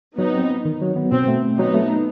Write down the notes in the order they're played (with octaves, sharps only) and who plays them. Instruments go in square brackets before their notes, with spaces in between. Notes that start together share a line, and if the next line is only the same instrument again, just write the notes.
[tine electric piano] F#3 [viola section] B3 D#4
[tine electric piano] C4
D#4
D#3
F#3
B3
[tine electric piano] B2 [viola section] C4
[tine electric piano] A3
C4
[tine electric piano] F#3 [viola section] B3 D#4
[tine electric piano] A3
D#4